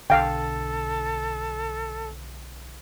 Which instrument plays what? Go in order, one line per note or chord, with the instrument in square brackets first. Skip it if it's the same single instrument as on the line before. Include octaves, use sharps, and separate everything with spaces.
[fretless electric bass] B1 D3 [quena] A4 [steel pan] F5 G5